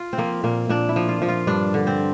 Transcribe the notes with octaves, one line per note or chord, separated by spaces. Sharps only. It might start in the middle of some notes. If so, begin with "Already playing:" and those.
Already playing: F4
C4
F3 A#3
A#2 A#3
A#2 D4
E4
F3
F4
F3
F4
G2 D4
D3
C4